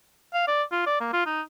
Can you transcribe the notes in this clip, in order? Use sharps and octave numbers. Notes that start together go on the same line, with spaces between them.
F5
D5
F4
D5
A#3
F4
D#4